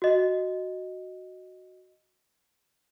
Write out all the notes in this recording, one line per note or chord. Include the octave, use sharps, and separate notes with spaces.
F#4 D#5